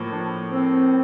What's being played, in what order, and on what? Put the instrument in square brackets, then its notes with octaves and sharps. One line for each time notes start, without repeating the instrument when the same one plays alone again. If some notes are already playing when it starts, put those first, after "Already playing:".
Already playing: [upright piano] A2 F3 A#3
[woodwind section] D4
C4